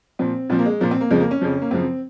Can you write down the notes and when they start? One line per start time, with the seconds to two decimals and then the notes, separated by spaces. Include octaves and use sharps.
0.19 A#2 F3 C4
0.49 A#2 F3 C4
0.59 A#3
0.65 G#3
0.80 A#2 F3 A#3
0.91 C4
1.01 A#3
1.11 F2 C#3 F3 G#3
1.20 A#3
1.31 C#4
1.41 F2 C#3 F3
1.62 A#3
1.71 F#2 C#3 F3 C4